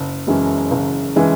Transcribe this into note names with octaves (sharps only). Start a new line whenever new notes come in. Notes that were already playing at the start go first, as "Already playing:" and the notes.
Already playing: F#1
F#2 E3 G#3 C#4
F#1
E3 G#3 C#4